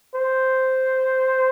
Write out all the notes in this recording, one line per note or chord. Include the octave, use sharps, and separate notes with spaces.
C5